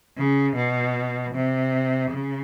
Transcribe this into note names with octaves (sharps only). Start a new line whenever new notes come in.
C#3
B2
C3
C#3